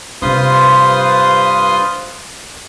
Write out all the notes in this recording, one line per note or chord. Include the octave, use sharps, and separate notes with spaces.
G2 C3 D4 F4 B4 C5 C6 D#6